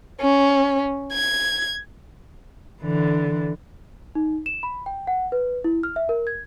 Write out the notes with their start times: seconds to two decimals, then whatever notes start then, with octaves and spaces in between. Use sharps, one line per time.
0.21 C#4
1.13 G#6
2.82 D3 E3
4.15 D#4
4.46 E7
4.63 B5
4.86 G5
5.07 F#5
5.32 B4
5.64 E4
5.83 F6
5.96 E5
6.09 A#4
6.27 G#6